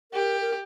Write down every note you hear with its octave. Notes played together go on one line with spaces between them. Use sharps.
G4 A#4
A#4